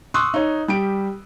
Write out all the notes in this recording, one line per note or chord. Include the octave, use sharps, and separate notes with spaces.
C6 C#6 D#6 E6 F#6
D#4 C#5
G3 G4 D7